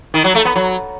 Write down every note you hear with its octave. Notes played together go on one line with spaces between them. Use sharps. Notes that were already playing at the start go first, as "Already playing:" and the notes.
D#3
F#3
A3
B3
F#3